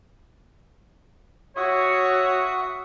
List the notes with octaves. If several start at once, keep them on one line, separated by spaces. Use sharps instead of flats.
F#4 C#5 E5 C#6 D#6